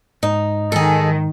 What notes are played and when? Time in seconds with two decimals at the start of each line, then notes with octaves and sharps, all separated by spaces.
0.23 G#2 D#4
0.72 D#3 G#4 A4